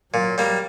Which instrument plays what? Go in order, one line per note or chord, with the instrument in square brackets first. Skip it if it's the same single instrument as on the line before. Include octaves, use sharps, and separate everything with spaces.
[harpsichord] A#2 [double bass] F#3
[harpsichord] G3 A#3